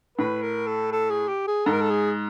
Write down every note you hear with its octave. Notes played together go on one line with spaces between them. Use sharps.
A2 B4
A#4
A4
A4
G#4
G4
G#4
G#2 A4
A#4
A4
G#4